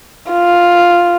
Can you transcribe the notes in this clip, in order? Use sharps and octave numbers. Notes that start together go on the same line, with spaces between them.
F4